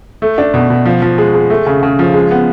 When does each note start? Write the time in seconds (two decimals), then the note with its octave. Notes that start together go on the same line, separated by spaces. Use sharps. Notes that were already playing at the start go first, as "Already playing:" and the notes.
0.22 A3
0.38 D4
0.54 B2
0.70 B2
0.86 F3
1.02 F3
1.18 G#3
1.34 G#3
1.50 A3
1.66 C#3
1.83 C#3
1.99 F3
2.14 G#3
2.31 B3